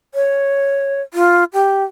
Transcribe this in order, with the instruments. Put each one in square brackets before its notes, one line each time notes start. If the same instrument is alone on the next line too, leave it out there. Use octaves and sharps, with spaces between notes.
[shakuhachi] C#5
F4
G4